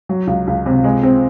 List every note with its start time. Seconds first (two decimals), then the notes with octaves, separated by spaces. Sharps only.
0.09 F#3
0.27 C#2
0.47 C#2
0.66 C3
0.84 G#3
1.03 C4